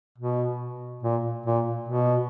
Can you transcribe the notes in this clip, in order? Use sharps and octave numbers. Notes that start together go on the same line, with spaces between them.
B2
A#2
A#2
B2